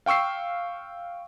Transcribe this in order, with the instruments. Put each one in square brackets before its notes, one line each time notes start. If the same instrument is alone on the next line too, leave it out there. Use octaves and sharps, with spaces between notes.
[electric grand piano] F5 G5 C#6 E6 C7